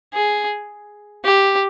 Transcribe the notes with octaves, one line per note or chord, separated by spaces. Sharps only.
G#4
G4